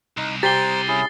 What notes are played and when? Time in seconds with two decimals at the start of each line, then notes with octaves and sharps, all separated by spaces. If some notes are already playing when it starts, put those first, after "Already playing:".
0.17 C2 D#4
0.43 G4 C5 A#5 A6 C7 G7
0.88 C#4 E4 G#4